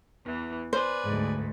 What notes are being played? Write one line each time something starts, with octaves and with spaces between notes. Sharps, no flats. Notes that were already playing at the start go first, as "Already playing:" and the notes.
E2 E3
B4 C5 D5 G#5
D2 G#2